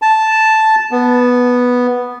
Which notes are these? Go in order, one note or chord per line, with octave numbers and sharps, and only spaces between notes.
A5
B3